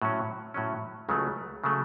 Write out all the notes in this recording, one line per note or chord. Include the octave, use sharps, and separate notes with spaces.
A2 F#3 C#4
A2 F#3 C#4
C#2 C#3 F#3 A3
C#3 F#3 A3